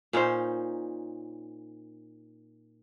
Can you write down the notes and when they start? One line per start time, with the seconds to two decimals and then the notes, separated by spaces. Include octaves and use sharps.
0.13 A#2 C#4 D#4 C5